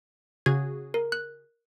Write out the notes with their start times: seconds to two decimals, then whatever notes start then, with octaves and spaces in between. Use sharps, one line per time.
0.46 C#3 F#4 G#4 G#6
0.94 A#4
1.12 F#6